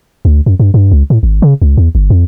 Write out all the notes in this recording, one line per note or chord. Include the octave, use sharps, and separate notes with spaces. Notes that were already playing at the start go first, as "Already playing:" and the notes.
D2
F#2
G2
G2
C#2
A2
G#1
C#3
C#2
E2
G1
F2